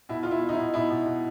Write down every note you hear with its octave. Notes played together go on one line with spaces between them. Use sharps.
B2 E4
B2 F4
E4
B2
D#4
E4
B2
B2 E4
B2
B2